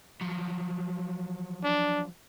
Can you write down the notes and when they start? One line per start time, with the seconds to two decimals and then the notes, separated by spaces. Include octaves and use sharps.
0.21 F3 F#3
1.63 D4